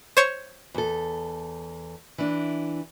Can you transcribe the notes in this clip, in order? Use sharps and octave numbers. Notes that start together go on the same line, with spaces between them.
C5 C#5
E2 A4
E3 D4